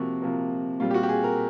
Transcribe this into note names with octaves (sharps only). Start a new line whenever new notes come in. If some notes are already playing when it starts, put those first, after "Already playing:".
Already playing: C3 F3 A#3 F#4
C3 F3 A#3
A#2 G3 C4 F4
G4
F#4
G4
G#4
A#4